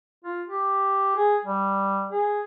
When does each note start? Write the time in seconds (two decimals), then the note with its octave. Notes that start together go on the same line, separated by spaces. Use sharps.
0.25 F4
0.47 G4
1.17 G#4
1.45 G3
2.12 G#4